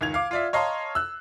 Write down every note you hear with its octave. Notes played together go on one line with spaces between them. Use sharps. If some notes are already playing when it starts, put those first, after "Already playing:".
C#2 D#3 G#6 F7
F5 D6
F4 D5 E5
C#5 D#5 F5 A5 A#5 C6
E6 F#6